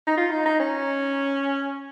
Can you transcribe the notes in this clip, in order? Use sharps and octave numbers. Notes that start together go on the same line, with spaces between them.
D#4
F4
D#4
D#4
C#4